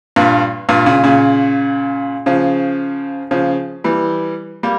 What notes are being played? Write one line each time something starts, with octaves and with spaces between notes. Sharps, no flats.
G2 A#2
G2 A#2
A#2 C#3
A#2 C#3
C#3 F3
C#3 F3
E3 G3
G3 A#3